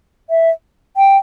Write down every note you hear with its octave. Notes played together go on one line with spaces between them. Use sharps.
E5
G5